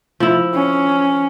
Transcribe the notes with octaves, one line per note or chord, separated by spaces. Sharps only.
F3 E4
C#4